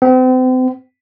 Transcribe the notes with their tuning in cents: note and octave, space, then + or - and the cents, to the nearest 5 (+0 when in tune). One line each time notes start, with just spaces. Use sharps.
C4 -40